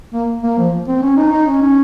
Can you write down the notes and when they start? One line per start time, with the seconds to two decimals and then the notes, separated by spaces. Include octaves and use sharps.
0.13 A#3
0.43 A#3
0.58 F3
0.88 C4
1.02 C#4
1.17 D#4
1.32 D#4
1.47 C#4
1.61 C#4